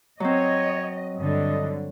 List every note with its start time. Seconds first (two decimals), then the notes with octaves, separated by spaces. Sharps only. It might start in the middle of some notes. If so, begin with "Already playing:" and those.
0.20 F#3 C4 C#5 D#5
1.16 G2 D3 D#5